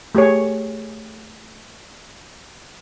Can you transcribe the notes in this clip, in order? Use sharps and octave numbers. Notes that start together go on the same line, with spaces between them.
A3 G4 G#4 C#5